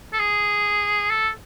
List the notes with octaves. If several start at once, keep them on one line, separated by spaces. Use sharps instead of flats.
A4
G#4
A4